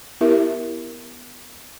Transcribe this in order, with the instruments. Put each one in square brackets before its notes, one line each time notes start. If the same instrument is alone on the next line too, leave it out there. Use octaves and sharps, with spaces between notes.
[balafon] B3 E4 G4 A#4 E5